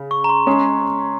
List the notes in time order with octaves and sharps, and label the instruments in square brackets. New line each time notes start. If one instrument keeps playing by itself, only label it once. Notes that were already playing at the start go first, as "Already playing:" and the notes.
Already playing: [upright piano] C#3
[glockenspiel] C#6
A#5
C6
[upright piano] G#3 C#4 G#4